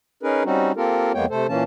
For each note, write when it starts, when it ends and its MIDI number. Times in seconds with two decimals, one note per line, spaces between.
0.23 0.43 61
0.23 0.43 63
0.23 0.43 68
0.23 0.43 70
0.23 0.43 71
0.45 0.72 55
0.45 0.72 60
0.45 0.72 61
0.45 0.72 63
0.45 0.72 66
0.76 1.12 58
0.76 1.12 60
0.76 1.12 65
0.76 1.12 67
0.76 1.12 69
0.76 1.12 70
1.14 1.26 41
1.14 1.26 56
1.14 1.26 58
1.14 1.26 59
1.14 1.26 73
1.14 1.26 79
1.30 1.47 48
1.30 1.47 57
1.30 1.47 69
1.30 1.47 72
1.49 1.64 46
1.49 1.64 52
1.49 1.64 58
1.49 1.64 61
1.49 1.64 81